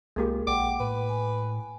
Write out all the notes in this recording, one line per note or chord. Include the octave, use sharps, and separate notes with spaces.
C2 G#3 A#3 G4
A#1 F#5 G5 D6
A2 B4
G#5